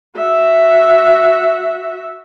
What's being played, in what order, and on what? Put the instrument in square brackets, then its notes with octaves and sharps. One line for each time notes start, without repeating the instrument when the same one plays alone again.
[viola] F#4 E5